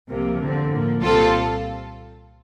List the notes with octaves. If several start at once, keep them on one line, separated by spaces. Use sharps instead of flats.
C2 C3 F3 A#3
E2 D3 F3 C4
A2 F3 A#3
C2 A#2 G3 C4 F4 A4